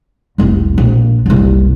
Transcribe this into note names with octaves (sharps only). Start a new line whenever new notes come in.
F1 C2
A#1
F#1 C2